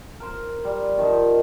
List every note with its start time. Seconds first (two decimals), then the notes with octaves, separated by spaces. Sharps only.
0.20 A#4 C5
0.64 G3
0.97 D#3 F3 D#4